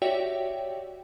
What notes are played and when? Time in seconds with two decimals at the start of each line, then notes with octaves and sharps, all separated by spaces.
0.02 F#4 G4 C#5 D5 E5 G5